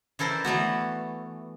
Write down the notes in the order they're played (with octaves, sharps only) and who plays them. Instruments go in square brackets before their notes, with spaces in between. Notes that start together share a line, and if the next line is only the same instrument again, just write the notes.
[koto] E3 E4 A4 A#4 C5 D5
E3 A3 B3 F#4